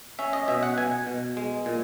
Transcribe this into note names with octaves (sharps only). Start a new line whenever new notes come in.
C#4 E5
D#5
B2 E5
F#5
B2 G#5
B2
G#3
A#2